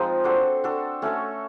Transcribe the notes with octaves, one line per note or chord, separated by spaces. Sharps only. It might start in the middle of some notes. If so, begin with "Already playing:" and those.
Already playing: F3 G#3 C4 D#4 F4 G#4
D4 F#4 A4 C5
D4 F#4 A4
A3 C#4 F#4 A4